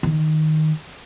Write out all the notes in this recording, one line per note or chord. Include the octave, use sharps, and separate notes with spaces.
D#3